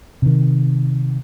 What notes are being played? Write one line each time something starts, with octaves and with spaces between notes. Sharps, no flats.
C3 D#3